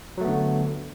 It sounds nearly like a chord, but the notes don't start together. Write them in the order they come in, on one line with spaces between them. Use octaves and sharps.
F#3 A3 B3 D3